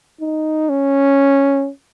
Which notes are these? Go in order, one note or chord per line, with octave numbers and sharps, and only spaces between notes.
D#4
C#4